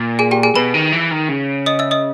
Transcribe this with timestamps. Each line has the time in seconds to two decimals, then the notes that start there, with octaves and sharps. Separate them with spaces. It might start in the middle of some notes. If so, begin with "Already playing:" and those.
Already playing: A#2
0.19 G#4 G#5
0.31 G4 G5
0.43 G#4 G#5
0.56 B2 B4 B5
0.74 D#3
0.93 E3
1.11 D#3
1.29 C#3
1.66 D#5 D#6
1.79 E5 E6
1.91 D#5 D#6